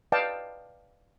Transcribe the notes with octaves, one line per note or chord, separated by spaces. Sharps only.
B4 D5 D#5 F5 G5 A5